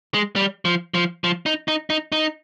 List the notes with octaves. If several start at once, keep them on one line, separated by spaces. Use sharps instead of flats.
G#3
G3
F3
F3
F3
D#4
D#4
D#4
D#4